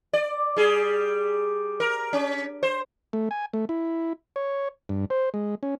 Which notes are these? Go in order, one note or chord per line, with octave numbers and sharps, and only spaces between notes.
D5
G3 G#4
A#4
C#4
C5
A3
G#5
A3
E4
C#5
G2
C5
G#3
C#4